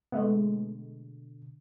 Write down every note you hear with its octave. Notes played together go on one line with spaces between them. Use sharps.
B2 D3 G#3 A3 B3